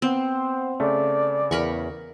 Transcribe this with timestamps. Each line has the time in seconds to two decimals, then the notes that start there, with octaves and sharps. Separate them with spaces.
0.02 B3 C4 C5 F#5
0.80 C#3 A3 D5
1.51 E2 A#4 B5 C#6